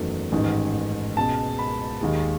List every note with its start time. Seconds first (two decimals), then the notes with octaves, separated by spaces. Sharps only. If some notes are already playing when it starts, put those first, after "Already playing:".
Already playing: F#1 E2 D#3 F#3 A3
0.32 A1 G#2 D#3
1.17 C#2 B2 G#3 A5
1.59 B5
2.01 D#2 D#3 G#3